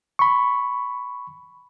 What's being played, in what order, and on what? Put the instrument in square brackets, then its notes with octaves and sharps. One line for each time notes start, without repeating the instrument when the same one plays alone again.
[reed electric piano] B5 C#6